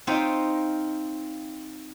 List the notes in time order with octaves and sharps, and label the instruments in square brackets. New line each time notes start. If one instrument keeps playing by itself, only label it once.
[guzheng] C4 D#4 F4 C#5 D#5 E5